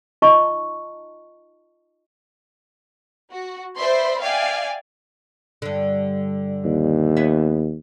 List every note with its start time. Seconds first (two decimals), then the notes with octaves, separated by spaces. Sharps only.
0.22 D#4 F4 D#5 A5 A#5 C#6
3.31 F#4
3.76 B4 C5 D5 E5 B5 C6
4.21 D5 E5 F5 G5 G#5
5.62 G2 D3
6.65 D#2
7.17 B3 C#5 E5